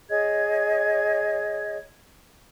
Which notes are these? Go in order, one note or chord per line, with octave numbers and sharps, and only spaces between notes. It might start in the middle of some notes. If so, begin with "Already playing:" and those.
G#4 C#5 D#5 G#6